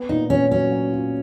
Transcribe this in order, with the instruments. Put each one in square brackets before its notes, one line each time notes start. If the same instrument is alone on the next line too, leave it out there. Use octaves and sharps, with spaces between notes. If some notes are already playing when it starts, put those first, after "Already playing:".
Already playing: [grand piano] B3
[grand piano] A#2 [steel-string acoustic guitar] D#4
[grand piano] A#2 [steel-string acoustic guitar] C#4
[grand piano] F#3 [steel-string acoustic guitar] C#4
[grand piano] F#3
F4